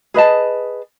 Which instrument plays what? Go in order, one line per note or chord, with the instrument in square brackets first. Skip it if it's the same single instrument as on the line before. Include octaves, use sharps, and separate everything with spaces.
[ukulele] G#4 B4 D#5 A5